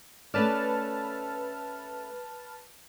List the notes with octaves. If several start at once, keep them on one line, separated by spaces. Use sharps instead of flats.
A3 C#4 B4 D5 A5 F6